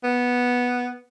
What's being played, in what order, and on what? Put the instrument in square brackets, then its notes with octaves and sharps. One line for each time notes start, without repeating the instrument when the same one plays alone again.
[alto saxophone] B3